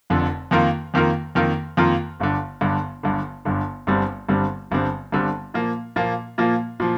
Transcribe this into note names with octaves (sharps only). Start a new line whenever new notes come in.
F1 F2 D3
F2 D#3 A#3 F4 A#4
F2 D#3 A#3 F4 A#4
F2 D#3 A#3 F4 A#4
F2 D#3 A#3 F4 A#4
G1 G2 D3
G1 G2 D3
G1 G2 D3
G1 G2 D3
G1 G2 D3 G3 C4
G1 G2 D3 G3 C4
G1 G2 D3 G3 C4
G1 G2 D3 G3 C4
A#2 F3 A#3
A#2 F3 A#3
A#2 F3 A#3
A#2 F3